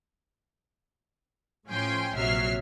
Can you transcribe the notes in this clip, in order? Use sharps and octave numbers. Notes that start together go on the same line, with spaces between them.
A2 F3 C#4 G5 G#5 C6
A#1 C3 F#3 E5 F6 C7